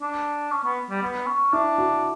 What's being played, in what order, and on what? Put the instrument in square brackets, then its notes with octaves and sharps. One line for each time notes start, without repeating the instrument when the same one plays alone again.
[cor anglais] D4
C#4
B3
G3
B3
C#4
[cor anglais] D4 [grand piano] E4
[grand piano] F#4